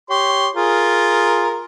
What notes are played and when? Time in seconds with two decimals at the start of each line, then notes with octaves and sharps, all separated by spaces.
0.10 G4 C#5 C6
0.55 F4 G#4 A#4